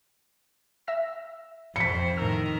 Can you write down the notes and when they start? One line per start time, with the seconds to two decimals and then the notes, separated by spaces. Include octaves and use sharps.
0.87 E5 E6 A#6
1.76 F2 C4 C5 B6 C#7
2.17 A2 D#3 A#4 E6